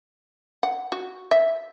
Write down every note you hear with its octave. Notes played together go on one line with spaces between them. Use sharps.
F#5
F#4
E5